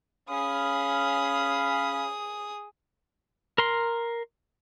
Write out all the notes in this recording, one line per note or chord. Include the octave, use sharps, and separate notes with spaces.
C#4 G#4 F5 B5 D#6
A#4 C6